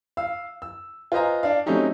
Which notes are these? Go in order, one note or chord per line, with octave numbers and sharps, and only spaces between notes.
F5 E6
E6
F4 B4 C5 D#5 G#5 A#5
D4 D5 F5
F#3 A3 C4 C#4 D#4 G4